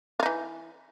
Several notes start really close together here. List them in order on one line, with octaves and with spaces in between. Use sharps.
F4 D#4 E3